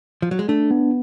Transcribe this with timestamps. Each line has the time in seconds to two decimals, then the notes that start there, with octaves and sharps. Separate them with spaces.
0.22 F3
0.31 F#3
0.39 G#3
0.49 A3 D4
0.71 B3